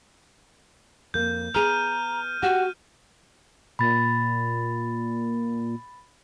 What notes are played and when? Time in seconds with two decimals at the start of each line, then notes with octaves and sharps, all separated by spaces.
1.14 F2 A#3 G6
1.55 B3 G#4 A#5 F6 D#7
2.43 F#4 G4 F#5
3.79 A#2 B5 A6